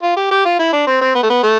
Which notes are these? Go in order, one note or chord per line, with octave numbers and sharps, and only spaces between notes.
F4
G4
G4
F4
E4
D4
C4
C4
B3
A3
B3
A3